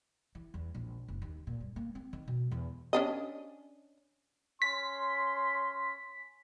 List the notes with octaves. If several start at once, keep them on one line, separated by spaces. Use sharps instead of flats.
E3
E2
A#1
F#1
D#2
A#2
G2
A#3
C4
D#3
B2
E2
C#4 D4 D#5
C#4 C6 B6